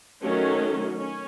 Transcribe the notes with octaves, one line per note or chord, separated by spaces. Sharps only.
D#3 F#3 A3 C#4
C#4